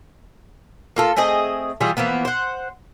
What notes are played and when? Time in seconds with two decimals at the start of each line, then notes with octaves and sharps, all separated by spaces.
0.96 A#3 F4 A4
1.16 A3 C4 G#4 D#5
1.80 E3 G3 F4 G#4
1.97 E3 F3 A#3 B3
2.25 C5 F#5